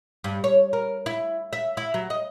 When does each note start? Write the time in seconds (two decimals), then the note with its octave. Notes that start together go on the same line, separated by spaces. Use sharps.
0.24 G2
0.44 C#5
0.73 A#4
1.06 E4
1.53 E5
1.77 E4
1.94 F#3
2.10 D#5